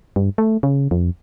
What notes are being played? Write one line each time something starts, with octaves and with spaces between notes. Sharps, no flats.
G2
A3
C#3
F2